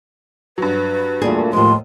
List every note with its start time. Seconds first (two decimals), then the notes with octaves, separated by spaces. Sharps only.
0.58 G2 F#3 B4
1.22 E2 A#2 G3 A3 G#4
1.53 D#2 A2 F3 G#3 F4 C6